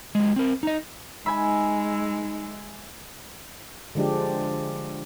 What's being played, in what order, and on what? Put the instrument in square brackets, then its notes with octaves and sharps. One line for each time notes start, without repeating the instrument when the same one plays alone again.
[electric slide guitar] F#3 G#3
C4 A#4
D#4 D#5
[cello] G#3 [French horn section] D#4 [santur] E5 G#5 [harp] B5
[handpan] D3 F3 G#3 D4 G4